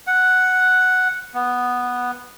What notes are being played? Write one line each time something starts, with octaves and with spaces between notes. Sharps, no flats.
F#5
B3